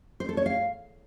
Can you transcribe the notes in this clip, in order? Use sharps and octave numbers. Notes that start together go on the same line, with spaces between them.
C5
A4
C#5
F5